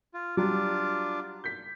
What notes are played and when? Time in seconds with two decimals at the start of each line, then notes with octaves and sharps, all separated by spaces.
0.14 F4
0.37 F#3 G3 D4 F4 D6
1.44 G6 B6